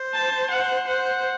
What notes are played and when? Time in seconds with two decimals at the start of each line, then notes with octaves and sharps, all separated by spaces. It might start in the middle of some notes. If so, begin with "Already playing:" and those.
Already playing: C5
0.13 A5
0.50 F#5
0.86 C5 F#5